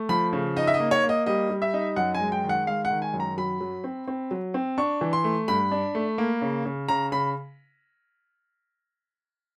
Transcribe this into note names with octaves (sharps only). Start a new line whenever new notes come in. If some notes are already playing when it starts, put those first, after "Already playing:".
Already playing: A3
F3 B5
C#3
D#4 D#5
E5
D#5
A#3
C#5
A#3
D#5
G3 D#5
G3
E5
D#4
F#2 F#5
G#5
G#3
G5
D#3
F#5
G#3 F5
F#5
D#3
G#5
F#2
A#5
F#3 B5
F#3
C4
C4
F#3
C4
D4 C#6
E3
C6
A3
G2 B5
D4
A3
A#3
C#3
C#3
C#3 A#5
C#3 B5